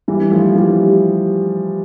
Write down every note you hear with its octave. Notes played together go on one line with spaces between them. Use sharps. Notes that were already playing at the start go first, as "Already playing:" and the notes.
E3 G3
F3 A3
E3 G3